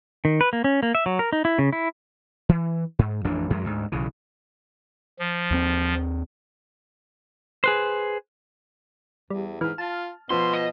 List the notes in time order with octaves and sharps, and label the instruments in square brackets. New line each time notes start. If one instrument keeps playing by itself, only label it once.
[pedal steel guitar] D#3
B4
A#3
C#4
A#3
E5
F#3
A#4
D#4
E4
C#3
E4
[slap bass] E3
G#2
A1 F2 E3 D4
F#2 F3 F#3 G#3
D2 G#2
B1 C#3 E3
[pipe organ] F3
[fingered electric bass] D#2 G#3 C4
[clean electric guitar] G#4 B4 C5
[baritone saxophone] E2 [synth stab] G3
[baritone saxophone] G#2 [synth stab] E3 [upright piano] F6
[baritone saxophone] F4 [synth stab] A5
[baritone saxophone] B2 [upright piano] F3 [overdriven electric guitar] C6
[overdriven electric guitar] D#5